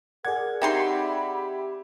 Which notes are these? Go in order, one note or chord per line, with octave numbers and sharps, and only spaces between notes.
G#4 A#4 D5 F#5 G#6
C4 D#4 G4 E5 B5 C6